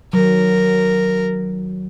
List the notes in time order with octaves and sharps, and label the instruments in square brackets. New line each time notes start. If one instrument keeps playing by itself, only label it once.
[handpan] D#3 F#3 [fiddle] A#4